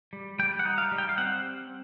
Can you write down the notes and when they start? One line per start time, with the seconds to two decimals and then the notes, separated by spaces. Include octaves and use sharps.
0.13 G3
0.39 G3 G5
0.59 F#5
0.65 D#4
0.78 F5
0.92 G3
0.98 G5
1.09 F5
1.18 C4 F#5